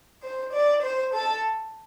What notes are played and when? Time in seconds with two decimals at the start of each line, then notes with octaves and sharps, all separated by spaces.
0.22 C5
0.52 D5
0.82 C5
1.13 A4